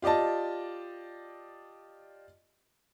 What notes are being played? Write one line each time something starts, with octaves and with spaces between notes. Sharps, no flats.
F4 G4 D5 D#5 A5